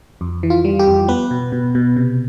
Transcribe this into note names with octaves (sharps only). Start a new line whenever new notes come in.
F2
E3
F4
G3
G4
F2
B3 B4
B2
B2
B2
C3